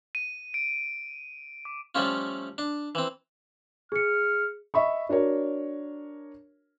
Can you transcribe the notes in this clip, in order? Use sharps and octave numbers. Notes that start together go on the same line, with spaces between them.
D#7
D7
D6
F3 G3 A3 C#4 F4
D4
E3 C4
G#4 F6 C#7
D#5 E5 B5 C#6
D4 F#4 A#4 C#5